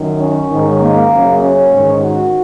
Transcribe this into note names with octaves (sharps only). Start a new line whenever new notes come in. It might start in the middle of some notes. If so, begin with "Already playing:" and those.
Already playing: F#2 D#3
C#4
G#2 D#3
A#3
F#2 C#3
C#4
G#2 D#3
F#4